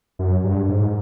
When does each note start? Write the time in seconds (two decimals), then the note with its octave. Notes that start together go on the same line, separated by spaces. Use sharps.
0.19 F#2
0.44 G2
0.69 G#2